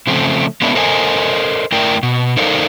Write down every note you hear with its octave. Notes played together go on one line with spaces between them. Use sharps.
C#3 F3 A3 C4
G#3 A#3 B3 C#4 D4 E4
A4 A#4 C5 D#5 G#5
A3 E4 A#4 D5 G5
B2
D#4 A4 A#4 C5 D5 F5